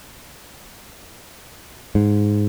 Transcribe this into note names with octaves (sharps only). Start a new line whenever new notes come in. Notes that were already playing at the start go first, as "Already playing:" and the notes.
G#2